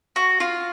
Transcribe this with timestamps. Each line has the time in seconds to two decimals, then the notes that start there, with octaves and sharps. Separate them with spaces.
0.16 F#4
0.40 F4